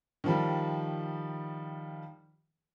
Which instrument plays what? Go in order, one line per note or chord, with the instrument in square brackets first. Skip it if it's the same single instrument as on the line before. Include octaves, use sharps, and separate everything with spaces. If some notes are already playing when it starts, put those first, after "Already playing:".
[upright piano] D#3 F3 G3